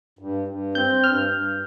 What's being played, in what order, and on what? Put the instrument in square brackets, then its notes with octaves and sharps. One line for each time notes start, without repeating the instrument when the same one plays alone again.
[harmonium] G2
G2
[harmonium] C4 [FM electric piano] G6
[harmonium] G2 [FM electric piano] F6
[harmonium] G2